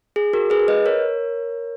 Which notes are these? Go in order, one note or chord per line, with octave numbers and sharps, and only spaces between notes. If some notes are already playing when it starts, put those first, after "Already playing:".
G#4
F#4 A#4
G#4 B4
B4 D#5
A#4 C#5